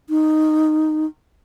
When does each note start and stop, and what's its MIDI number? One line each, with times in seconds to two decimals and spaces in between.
0.10 1.05 63